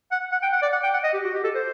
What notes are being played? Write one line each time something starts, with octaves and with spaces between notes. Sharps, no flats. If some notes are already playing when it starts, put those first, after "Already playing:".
F#5
F#5
G5
F#5
D5
F#5
G5
F#5
D#5
G4
F#4
G4
A4
C5